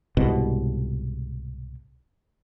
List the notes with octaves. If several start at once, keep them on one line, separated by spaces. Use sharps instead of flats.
C2 G#2 B2